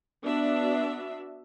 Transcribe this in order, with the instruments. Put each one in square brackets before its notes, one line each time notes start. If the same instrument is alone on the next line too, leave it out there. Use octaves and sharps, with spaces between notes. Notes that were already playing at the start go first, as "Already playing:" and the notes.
[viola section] B3 D4 F#4 E5